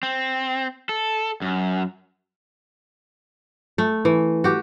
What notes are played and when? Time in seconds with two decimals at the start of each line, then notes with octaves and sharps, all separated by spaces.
0.03 C4
0.89 A4
1.42 F#2
3.78 A3
4.05 E3
4.44 F#4 G4